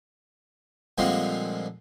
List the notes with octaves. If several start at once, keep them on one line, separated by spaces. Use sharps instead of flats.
A#2 D3 F3 G3 G#3 C4